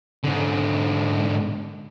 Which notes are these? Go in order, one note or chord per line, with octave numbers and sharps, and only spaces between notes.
G#2 D3